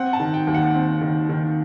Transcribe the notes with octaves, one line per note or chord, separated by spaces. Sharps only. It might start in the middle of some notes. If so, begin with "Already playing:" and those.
Already playing: C4 F#5
A5
D#3
G5
D#2
F#5
C4
D#3
D#3